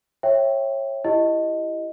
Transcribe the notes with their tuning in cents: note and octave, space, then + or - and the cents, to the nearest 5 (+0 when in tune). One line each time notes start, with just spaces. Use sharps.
C#5 -25 E5 +0 G5 +0
E4 +15 G4 +0 D#5 +0